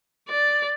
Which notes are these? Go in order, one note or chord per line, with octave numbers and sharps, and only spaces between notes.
D5